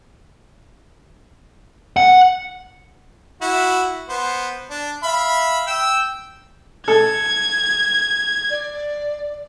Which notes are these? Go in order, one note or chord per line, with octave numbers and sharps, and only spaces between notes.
F#5
E4 F#4
B3 C5
D4
E5 F5 B5
G5 E6
A4 G#6
D5